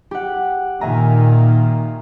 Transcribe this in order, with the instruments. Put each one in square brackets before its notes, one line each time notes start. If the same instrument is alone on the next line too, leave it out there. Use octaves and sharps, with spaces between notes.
[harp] G4 F#5
[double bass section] A#2 D#3 A#3 [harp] E5 G#5 A#5